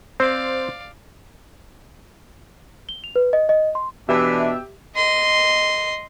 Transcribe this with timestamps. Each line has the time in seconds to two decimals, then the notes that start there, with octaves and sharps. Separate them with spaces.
0.20 C4 C5 D5 F5
2.89 G7
3.04 F7
3.16 B4
3.33 D#5
3.49 D#5
3.75 C6
4.09 B2 E3 D4 G4 E5
4.96 D#5 C6